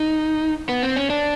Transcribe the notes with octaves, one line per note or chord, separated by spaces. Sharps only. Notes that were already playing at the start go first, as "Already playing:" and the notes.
Already playing: D#4
B3
C4
C#4
D4